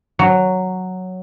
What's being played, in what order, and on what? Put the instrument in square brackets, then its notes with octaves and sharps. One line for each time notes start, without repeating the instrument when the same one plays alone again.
[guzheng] F#3